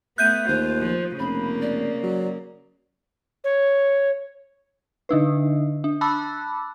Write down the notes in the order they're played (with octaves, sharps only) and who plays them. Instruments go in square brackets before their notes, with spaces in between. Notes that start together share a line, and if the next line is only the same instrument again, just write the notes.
[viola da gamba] A3 B3 [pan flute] E5 [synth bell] F#6 G6 D#7
[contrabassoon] D#2 [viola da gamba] F4 [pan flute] C5
[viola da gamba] F3
[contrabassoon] F1 [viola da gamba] C#3 A#3 [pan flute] B5
[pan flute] D5
[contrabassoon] F#3
[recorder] C#5
[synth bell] D3 D4 D#4 B4
D4
A5 B5 D6 E6 F#6 A6